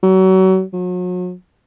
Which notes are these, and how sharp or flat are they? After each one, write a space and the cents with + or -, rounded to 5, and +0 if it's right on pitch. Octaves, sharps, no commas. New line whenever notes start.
F#3 +30
F#3 -40